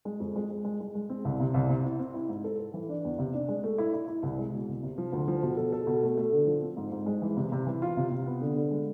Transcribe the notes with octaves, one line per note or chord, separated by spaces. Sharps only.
G#3
F2
G#3
G#3
G#3
G#3
G#3
C4
C2
C3
C2
C3
E4
C4
E4
G#2
A4
A4
E3
D4
E2
C3
D4
G#3
A3
E4
E4
E4
C2
G#3
B2
C2
C3
F3
D2
F3
B2
A4
A4
B2
A3
A3
D3
F3
C4
G#2
G#2
G#3
E3
C3
C3
E3
F4
C3
C3
B3
D3
D3
G#3